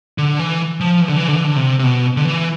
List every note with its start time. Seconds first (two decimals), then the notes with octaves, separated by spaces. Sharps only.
0.18 D3
0.39 E3
0.80 F3
1.01 E3
1.09 D3
1.16 E3
1.29 D3
1.37 E3
1.44 D3
1.56 C3
1.79 C3
1.84 B2
2.17 D3
2.25 E3